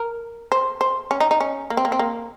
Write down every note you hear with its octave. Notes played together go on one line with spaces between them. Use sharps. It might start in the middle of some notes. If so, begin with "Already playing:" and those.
Already playing: A#4
C5
C5
C#4
D#4
D#4
C#4
A#3
C4
A#3
C4
A#3